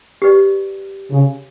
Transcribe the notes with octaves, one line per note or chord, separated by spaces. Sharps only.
G4 B4 D5
C#3